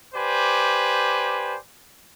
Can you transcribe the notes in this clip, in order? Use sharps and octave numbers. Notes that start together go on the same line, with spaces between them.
G4 B4 C5 D5 G#5